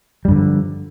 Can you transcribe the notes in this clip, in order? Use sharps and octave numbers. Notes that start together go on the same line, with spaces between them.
G2 D3 F3 G3